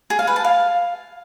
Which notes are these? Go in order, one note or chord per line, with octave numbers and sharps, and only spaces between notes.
G#4
F5
B4
A5
F5